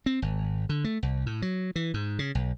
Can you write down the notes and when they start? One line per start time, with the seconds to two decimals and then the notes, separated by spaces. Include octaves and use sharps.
0.06 C4
0.22 G#1
0.69 D3
0.84 A3
1.03 C2
1.26 A2
1.42 F#3
1.76 E3
1.94 G#2
2.19 C#3
2.35 B1